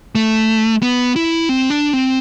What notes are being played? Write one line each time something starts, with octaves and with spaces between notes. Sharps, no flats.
A3
B3
E4
C4
D4
C4